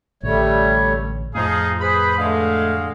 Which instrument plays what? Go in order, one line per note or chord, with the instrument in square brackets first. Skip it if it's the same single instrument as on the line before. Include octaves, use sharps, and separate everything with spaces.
[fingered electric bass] A1 D3 [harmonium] G3 A3 C#5
[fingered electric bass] F2 A2 [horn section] F3 D#4 G#4 [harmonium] F5
[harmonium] G#4 B4 C5 [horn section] B5
[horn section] D3 G#3 F5 [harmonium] A3